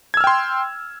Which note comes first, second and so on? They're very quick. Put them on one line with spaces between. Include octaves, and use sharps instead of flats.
G#6 E6 F6 G5 C6